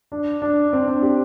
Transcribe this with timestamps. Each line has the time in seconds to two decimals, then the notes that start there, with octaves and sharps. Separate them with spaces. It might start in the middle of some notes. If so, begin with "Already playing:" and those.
0.12 D4
0.42 D4
0.73 C4
0.88 D4
1.03 G4